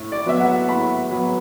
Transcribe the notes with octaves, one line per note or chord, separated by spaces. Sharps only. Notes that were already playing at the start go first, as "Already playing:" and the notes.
Already playing: A2
D5
F#3 B3 E5
F#5
A2 B5
F#3 B3